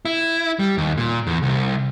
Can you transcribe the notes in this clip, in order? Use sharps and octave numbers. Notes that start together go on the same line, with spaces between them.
E4
G3
D#2
A#2
E2
C2